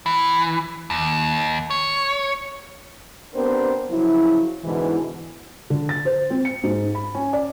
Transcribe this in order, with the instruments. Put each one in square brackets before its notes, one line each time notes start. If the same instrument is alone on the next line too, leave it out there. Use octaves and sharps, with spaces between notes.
[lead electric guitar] E3
D#2
C#5
[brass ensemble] B3 C4 D4 G4 A#4 C5
C#3 F3 F#3 E4
G#2 B2 D3 E3
[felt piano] D3
A6
C5
C4
C#7
G#2
B5
C#4
D5